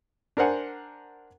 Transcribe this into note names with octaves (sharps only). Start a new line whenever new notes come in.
D4 A#4 C5 F#5 G#5